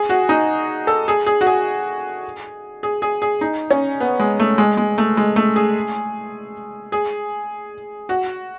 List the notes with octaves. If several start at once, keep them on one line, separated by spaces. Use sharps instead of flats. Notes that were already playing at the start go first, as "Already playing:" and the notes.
Already playing: G#4
F#4
D#4
A4
G#4
G#4
F#4
G#4
G#4
G#4
G#4
D#4
C#4
B3
G#3
A3
G#3
G#3
A3
G#3
A3
G#4
G#4
F#4